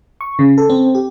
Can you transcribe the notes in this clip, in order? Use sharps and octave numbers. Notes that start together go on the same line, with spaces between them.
C#6
C#3
A4
C4
G4